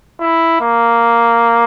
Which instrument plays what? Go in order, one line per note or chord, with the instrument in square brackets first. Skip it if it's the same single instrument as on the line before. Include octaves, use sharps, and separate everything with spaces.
[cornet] E4
A#3